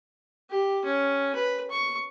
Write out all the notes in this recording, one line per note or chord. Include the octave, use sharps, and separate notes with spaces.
G4
C#4
B4
C#6